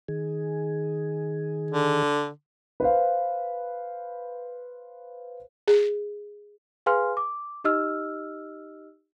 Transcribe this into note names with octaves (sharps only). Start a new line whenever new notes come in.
D#3 G#4
D3
B4 C5 F5
G#4
G#4 B4 F5 G#5 C6 F6
D6
D#4 G4 D#5 E6 F6